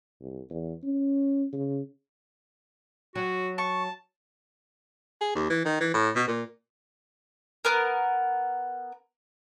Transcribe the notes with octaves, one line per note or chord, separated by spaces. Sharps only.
C2
E2
C#4
C#3
F#3 F#4
A5 C#6
G#4
D#2
E3
D#3
E3
A2
B2
A#2
B3 A#4